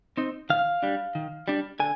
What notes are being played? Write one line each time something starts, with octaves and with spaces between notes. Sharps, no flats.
C4 D#4
D#3 F5
G3 D4
D#3
G3 D4
D3 G#5